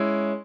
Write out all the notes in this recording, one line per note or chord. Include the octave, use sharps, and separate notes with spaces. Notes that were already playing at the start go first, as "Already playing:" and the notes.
Already playing: G#3 C#4 E4